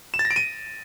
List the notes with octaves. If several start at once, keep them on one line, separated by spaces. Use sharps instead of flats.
E7
A6
A#6
D7
D#7